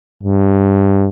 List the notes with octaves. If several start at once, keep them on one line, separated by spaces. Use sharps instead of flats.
G2